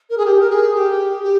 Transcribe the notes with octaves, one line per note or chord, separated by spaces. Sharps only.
A#4
G#4
G4
A#4
G#4
G4
G4